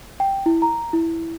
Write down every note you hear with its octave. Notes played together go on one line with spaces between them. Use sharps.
G5
E4
A#5
E4